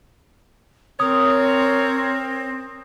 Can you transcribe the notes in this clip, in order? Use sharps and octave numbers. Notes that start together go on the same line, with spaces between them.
C4 A#4 C#5 D#6